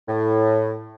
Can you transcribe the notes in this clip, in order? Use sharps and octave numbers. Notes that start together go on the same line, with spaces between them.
A2